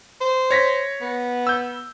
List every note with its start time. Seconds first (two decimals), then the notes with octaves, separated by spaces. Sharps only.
0.21 C5
0.51 C#5 A#6 B6
1.01 B3
1.47 E6 G6